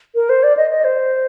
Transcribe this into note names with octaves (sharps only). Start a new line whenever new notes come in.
A#4
C5
D5
D#5
D#5
C5